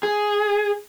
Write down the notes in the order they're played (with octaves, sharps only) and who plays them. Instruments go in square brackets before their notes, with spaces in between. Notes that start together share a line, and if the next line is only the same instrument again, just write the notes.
[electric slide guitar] G#4